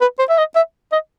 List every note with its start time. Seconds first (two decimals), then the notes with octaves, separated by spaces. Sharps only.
0.01 B4
0.19 C5
0.29 E5
0.38 D#5
0.56 E5
0.92 D#5